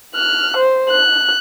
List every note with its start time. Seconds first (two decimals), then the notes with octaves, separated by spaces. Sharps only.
0.15 F6 F#6
0.57 C5
0.90 F#6